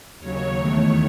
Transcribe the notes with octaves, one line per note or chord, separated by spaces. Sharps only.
D#2 C#3 F#3 C#5
E2 D#3 A3